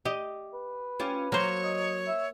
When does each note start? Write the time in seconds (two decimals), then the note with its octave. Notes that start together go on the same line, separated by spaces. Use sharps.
0.05 G4 D#5
0.53 B4
0.99 C#4 F4 G4
1.32 F#3 A#3 C5 C#5
1.64 D#5
2.07 E5